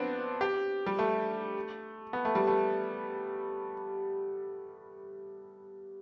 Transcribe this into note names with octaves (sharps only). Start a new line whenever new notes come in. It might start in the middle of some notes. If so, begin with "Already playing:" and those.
Already playing: B3 C4 D4
G4
G3
A3
B3
A3
G3
A3